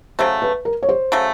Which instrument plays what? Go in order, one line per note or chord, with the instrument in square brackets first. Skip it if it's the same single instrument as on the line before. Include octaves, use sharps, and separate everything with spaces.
[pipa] C#3 F#3 A3 [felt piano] C5
[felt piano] B4
A#4
C#5
C5
[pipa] C#3 F#3 A3